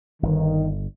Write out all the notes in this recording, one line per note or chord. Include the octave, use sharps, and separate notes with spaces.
G1 D#3